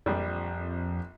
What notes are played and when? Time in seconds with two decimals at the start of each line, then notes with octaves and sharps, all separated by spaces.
0.06 A#1 F2 G3